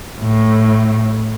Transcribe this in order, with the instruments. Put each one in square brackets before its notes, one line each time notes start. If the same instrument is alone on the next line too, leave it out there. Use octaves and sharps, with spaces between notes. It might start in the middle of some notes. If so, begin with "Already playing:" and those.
[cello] A2